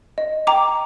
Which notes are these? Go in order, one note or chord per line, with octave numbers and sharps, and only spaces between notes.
D#5
G5 A#5 D6